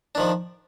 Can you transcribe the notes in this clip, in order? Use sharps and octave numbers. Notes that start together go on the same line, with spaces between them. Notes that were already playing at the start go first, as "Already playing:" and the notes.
D#3 F3 D4